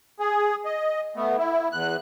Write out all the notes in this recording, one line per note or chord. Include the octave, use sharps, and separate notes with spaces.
G#4
D#5
A3 B3
E4
E2 F#6